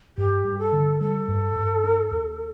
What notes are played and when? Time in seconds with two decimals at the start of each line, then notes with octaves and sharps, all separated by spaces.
0.18 G2 G4
0.44 G2
0.59 A4
0.73 D3
1.00 G3 A4
1.28 G2
1.56 G2
1.84 D4
2.11 D#2